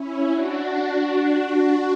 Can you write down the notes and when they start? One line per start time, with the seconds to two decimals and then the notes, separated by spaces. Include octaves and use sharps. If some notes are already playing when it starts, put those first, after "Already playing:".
Already playing: C#4 E4
0.30 D4 F#4